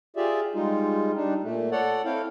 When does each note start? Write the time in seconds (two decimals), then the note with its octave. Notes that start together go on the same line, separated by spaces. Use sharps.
0.16 F4 G4 G#4 D5 E5
0.54 G3 G#3 D#4 F4
1.16 G3 D4 D#4
1.43 A#2 A3
1.72 A4 C#5 D5 F#5
2.05 C4 E4 A4 C#5 F5 G5